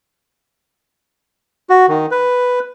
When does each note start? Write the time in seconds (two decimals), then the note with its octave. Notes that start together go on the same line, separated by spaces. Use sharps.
1.70 F#4
1.88 D#3
2.11 B4